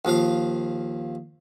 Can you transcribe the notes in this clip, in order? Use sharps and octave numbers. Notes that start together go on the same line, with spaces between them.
D#2 F3 F4 F5